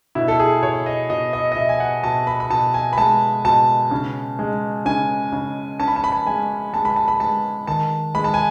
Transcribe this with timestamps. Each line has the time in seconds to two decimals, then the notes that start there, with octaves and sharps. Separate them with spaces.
0.15 B2 E4
0.28 A4
0.40 G#4
0.62 B2 C#5
0.86 D#5
1.10 B2 D#5
1.33 D#5
1.52 D#5
1.56 B2 E5
1.69 G#5
1.80 F#5
2.03 B2 A5
2.27 B5
2.40 B5
2.51 B2 A5
2.74 G#5
2.93 B5
2.98 G#3 A5
3.45 B2 A5
3.91 C#3
4.39 G#3
4.86 C#3 G#5
5.32 C#3
5.80 C#4 A5
5.88 B5
5.96 A5
6.04 B5
6.12 A5
6.27 G#3 G#5
6.73 G#3 A5
6.85 B5
6.96 A5
7.08 B5
7.20 G#3 A5
7.67 D#3 A5
8.15 G#3 B5
8.24 A5
8.34 G#5